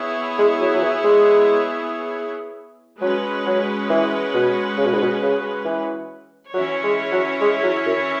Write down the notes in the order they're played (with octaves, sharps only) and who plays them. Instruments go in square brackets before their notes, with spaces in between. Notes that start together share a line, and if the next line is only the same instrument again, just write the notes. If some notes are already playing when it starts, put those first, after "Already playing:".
Already playing: [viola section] B3 E4 G#4 C#5
[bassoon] G#3
F#3
F#3
E3
G#3
[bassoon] F#3 [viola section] G#3 C#4 F#4 B4
[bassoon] F#3
E3
B2
C#3
B2
G#2
B2
C#3
E3
[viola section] E3 C#4 E4 C#5 [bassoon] F#3
[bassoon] G#3
F#3
G#3
F#3
F#2